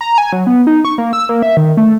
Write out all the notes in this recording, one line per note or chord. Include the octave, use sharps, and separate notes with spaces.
A#5
G#5
F#3
B3
D#4
C#6
A#3
E6
A#3
E5
D#3
A3